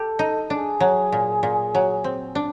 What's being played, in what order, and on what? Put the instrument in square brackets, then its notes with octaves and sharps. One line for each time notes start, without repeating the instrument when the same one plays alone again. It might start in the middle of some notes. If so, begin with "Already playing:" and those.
Already playing: [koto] G4 [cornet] A4
[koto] D#4
[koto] D4 [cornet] G#4
[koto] F#3
A#2
A#2
F#3
C4
D4